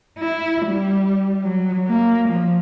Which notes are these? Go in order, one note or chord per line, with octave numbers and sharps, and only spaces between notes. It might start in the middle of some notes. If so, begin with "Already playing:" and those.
E4
G3
F#3
A#3
F3